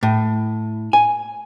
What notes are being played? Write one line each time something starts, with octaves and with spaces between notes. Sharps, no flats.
A2
G#5